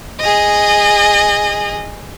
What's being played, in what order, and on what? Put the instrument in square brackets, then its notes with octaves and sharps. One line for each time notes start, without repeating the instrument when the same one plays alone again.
[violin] G#4 D#5